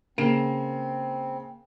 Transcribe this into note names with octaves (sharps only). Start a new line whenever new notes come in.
C#3 A#3 C4 D7 E7